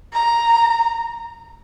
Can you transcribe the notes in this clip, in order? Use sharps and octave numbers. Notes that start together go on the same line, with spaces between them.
A#5